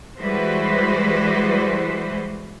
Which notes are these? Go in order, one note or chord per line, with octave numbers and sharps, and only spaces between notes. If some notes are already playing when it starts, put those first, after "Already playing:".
E3 G3 G#3 F#4 B4 C5